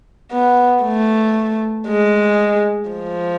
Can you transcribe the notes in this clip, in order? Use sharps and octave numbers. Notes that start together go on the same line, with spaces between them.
B3
A3
G#3
F3